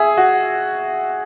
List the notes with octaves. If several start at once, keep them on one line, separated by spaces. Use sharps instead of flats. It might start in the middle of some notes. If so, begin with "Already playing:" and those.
Already playing: G#4 E5
F#4